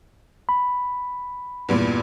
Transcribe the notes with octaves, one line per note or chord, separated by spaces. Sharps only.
B5
E2 G2 A#2